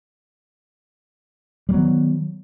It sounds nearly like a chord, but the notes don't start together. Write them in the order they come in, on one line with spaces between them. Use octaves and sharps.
G3 F#3 B3 D#3